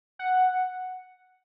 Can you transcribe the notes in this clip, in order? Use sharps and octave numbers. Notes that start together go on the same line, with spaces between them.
F#5